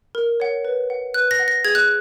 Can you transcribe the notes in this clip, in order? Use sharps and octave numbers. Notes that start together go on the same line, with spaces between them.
A#4
C#5 F#5
B4
F#5
B4 F#6
A#6
F#5
A#6
G#4 G#6
F#6